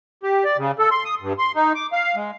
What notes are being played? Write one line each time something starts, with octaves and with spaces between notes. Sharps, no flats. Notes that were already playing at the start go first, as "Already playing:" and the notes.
G4
D5
C#3
A4
C6
D#6
G2
C6
D#4
D6
F5
G#3